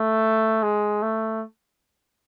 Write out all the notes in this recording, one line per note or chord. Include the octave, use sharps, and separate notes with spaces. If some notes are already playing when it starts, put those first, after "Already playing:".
Already playing: A3
G#3
A3